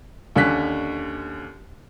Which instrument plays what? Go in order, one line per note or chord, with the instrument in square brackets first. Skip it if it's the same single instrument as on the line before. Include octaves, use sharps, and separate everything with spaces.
[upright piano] D#2 D3 C#4 F#6 B6